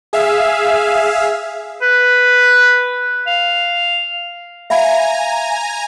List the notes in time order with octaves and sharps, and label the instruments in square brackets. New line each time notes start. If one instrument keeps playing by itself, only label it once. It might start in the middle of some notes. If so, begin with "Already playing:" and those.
[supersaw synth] G#4 E5 F5
[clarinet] B4
F5
[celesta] E5 F5 B5 [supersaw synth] G#5 A#5